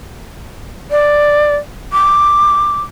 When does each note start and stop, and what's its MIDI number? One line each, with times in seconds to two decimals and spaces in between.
0.91 1.55 74
1.92 2.81 86